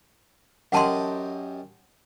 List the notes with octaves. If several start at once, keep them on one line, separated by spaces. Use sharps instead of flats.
F#2 G4 D#5 F#5 A5 C6